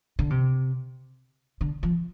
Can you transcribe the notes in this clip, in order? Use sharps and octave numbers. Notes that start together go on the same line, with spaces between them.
D3
C3
D3
F3